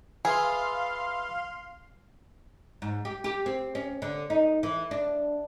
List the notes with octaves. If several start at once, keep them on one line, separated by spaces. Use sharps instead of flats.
F4 G#4 B4 E5 F5 C6
G#2
G4
G4
C4
C#4
D3
D#4
E3
D4